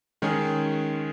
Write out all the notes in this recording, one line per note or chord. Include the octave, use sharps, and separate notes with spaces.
D#3 G#3 C#4 G#4